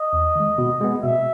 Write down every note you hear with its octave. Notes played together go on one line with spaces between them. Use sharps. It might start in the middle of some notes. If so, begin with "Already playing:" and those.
Already playing: D#5
E2
D#3 G#3
B2
G#3 B3
B2 E5